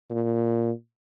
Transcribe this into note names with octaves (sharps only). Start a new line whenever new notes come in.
A#2